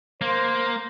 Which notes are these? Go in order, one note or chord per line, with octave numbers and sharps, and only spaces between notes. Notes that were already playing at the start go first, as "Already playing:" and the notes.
A#3 C5